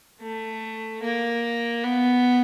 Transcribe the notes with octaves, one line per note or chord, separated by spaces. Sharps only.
A3
A#3
B3